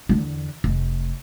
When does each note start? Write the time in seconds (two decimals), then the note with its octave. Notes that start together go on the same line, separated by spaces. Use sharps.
0.09 E2 D3
0.64 F1